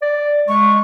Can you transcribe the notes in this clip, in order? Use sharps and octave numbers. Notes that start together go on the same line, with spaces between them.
D5
G#3 C#6